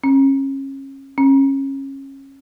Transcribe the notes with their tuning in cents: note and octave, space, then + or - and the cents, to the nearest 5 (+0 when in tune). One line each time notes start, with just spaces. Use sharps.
C#4 -30
C#4 -25